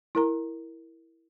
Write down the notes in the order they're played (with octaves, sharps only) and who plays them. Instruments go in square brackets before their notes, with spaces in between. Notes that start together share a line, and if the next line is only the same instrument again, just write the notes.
[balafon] E4 A#4 A#5